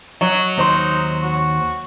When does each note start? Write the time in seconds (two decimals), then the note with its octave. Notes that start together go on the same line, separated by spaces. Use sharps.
0.21 F#3 D#5
0.58 D#2 D#4 C5 C6
1.22 F#4